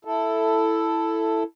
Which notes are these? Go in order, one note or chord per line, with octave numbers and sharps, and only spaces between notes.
E4 A4